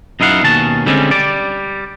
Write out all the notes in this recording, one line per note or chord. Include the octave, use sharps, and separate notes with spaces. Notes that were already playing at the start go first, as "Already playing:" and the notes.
F#2 D#4 E4 F5 F#5
D#2 B2 D#3 C#4 A5
D3 G3 G#3 C4 C#4
G3 D5